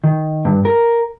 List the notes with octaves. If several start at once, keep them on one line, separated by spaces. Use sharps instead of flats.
D#3
G2
A#4